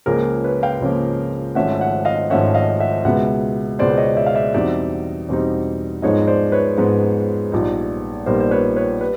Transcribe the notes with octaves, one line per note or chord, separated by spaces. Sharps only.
C#2 C#3 F3 A#3 G#4 A#4
B4 C#5
F5 G5
C#2 C#3 F3 A#3
G#1 G#2 F3 A3 C#4 E5 F#5
E5 F#5
D#5 F5
G#1 G#2 F3 A3 C#4 E5 F#5
D#5 F5
E5 F#5
C#2 B2 G#3 B3 E5 F#5
C#2 B2 G#3 B3 C5 D5
C#5 D#5
D5 E5
F5
D5 E5
E2 B2 G3 C4 D#4 D5 E5
E2 B2 G3 C4 D#4
G#2 F3 G#3 B3 D#4 C#5 D#5
C5 D5
B4 C#5
G#2 F3 G#3 B3 D#4
A#1 A#2 G3 B3 D#4
A#1 A#2 G3 B3 D#4 A#4 C5
C5
B4 C#5
B4 C#5
G3 B4